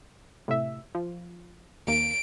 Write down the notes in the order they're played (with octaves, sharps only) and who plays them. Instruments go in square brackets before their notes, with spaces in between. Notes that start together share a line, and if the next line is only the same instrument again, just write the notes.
[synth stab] A2 C3 E5
F3
[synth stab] D#2 A#3 [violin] D7